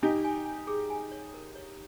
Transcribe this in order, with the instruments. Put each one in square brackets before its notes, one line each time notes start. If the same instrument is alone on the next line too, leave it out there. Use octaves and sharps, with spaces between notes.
[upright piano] D#4 G4 [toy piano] G#5
[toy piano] G#5
G#5
G#4
G#5
C#5
A#4
C#5